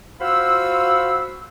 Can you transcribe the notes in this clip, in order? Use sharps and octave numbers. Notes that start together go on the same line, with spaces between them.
F4 F#4 C5 F5 B5 E6